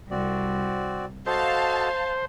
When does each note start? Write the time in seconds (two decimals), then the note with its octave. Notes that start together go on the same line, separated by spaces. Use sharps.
0.11 C2 C4 F#4 D5
1.26 F#4 A4 C5 D#5 F5 A5